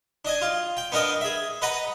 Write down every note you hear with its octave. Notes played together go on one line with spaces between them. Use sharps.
D4 D#5 G#5
F4
G5
B3 D4 A#4 D#5 G5
G#4 E5
B4 D#5 F#5 A#5 B5